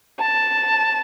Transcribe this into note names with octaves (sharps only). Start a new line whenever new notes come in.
A5